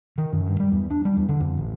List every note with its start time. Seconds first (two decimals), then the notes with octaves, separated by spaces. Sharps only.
0.18 D#3
0.33 F#2
0.47 G2
0.60 G3
0.72 E2
0.90 D4
1.05 G3
1.17 E2
1.29 D3
1.41 F2
1.58 A1